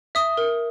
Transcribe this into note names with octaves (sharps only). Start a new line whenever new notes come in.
E5 D#6
A#4